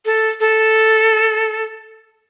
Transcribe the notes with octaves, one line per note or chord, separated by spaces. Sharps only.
A4
A4